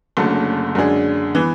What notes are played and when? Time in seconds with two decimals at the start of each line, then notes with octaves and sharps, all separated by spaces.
0.17 F#1 F#2 D3 A3
0.75 F#2 D3 G#3 D4 G#4
1.35 E3 B3